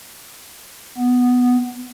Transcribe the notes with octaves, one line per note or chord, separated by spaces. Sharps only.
B3